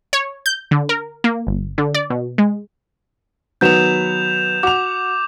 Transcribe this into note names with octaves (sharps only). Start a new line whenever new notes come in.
C#5
G6
D3
A#4
A#3
G1
D3
D5
B2
G#3
D#3 F#3 B3 G6 E7 F7
F#4 D6 F7